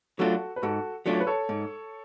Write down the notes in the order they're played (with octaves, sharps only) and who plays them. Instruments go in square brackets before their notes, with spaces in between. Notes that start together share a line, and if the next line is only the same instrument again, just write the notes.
[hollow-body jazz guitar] F#3 A3 D4 F4 [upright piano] F#4 A4
[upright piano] B4
[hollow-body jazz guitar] G#2 [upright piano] F#4 A4
[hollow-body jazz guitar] F#3 A3 D4 F4 [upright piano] D5
[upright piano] C#5
B4
A4 C#5
[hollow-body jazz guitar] G#2